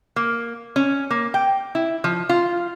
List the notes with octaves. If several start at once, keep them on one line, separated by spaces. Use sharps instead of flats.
A#3
C#4
A#3
G5
E4
F3
F4